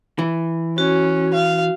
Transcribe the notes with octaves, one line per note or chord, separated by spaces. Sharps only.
E3
C#4 F#4
F5